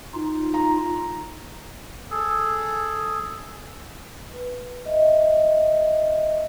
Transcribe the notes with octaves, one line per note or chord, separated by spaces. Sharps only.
D#4 F4
A#5
G#4 A4
B4
D#5 E5